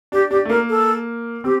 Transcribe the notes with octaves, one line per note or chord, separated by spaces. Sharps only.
D4 G4
D4 G4
A3
A#3 A#4
A4
C4 G4